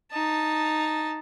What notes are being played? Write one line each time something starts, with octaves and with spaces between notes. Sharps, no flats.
D#4 A5